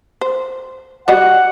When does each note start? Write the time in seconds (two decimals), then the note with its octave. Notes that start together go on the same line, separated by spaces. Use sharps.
0.21 C5
1.08 G3 F#4 D#5 F#5